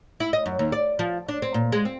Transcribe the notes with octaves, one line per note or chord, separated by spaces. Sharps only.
E4
D#5
F#2
D#2
D5
F3
D4
C4
A#2
G#3
C4